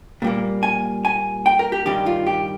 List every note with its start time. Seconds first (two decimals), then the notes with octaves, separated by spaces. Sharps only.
0.22 A#2 G3 A#3
0.63 G#5
1.05 G#5
1.46 G5
1.59 A#4
1.72 G4
1.86 G2 D#3 G3 G4
2.06 F4
2.27 G4